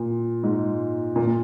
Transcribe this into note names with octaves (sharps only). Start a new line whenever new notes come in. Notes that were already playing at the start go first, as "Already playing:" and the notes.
Already playing: A#2
G#2
A#2